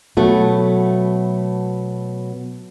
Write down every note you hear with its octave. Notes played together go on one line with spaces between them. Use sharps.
B2 F#3 A3 B3